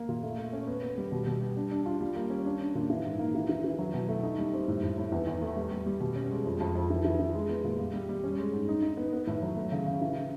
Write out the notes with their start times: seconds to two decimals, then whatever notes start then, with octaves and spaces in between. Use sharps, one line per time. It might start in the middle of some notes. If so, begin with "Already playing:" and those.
Already playing: A#3
0.09 A#2
0.23 A3
0.38 A3
0.53 C#4
0.67 B3
0.82 B3
0.98 G3
1.12 B2
1.27 B2
1.41 G3
1.57 D4
1.71 D4
1.86 F4
2.01 G3
2.15 A#3
2.30 C#4
2.46 D4
2.60 D4
2.75 A#2
2.90 E3
3.05 G#2
3.19 A#3
3.34 E3
3.49 E3
3.64 E3
3.79 F#3
3.94 B2
4.08 A3
4.23 D#4
4.38 G3
4.53 C4
4.68 A2
4.83 A2
4.98 A2
5.12 E2
5.27 E2
5.42 A3
5.56 G3
5.71 G3
5.86 G3
6.00 B2
6.16 C#4
6.31 G#3
6.46 F2
6.60 F2
6.75 F2
6.90 E3
7.05 E3
7.19 E3
7.35 G#3
7.49 B3
7.64 A#2
7.79 G3
7.94 G3
8.09 G3
8.23 C#4
8.38 G#3
8.53 G#2
8.68 D#4
8.82 D#4
8.97 B3
9.13 B3
9.27 A2
9.43 F#3
9.57 A3
9.72 C#3
9.87 C#3
10.01 E3